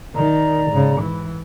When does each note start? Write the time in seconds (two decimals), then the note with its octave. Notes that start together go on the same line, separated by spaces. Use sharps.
0.15 D#3 D5 A#5
0.71 G#2 C#3
1.00 E3